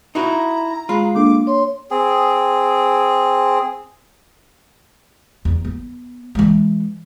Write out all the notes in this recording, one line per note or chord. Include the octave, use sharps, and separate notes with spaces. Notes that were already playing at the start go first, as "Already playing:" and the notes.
D#4 E4 F#4 A#5
G#3 F4 B5
A#3 D4 A4 D6
C#5 C6
C4 G#4
E2
B3
E3 G#3